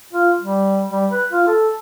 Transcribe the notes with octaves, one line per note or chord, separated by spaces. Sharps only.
F4
G3
G3
B4
F4
A4